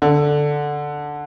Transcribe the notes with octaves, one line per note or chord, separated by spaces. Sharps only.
D3